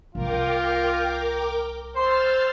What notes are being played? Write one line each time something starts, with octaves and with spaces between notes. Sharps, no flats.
C2 C3 F4 A#4 G5 D6
C5 C6 E6 F6 A6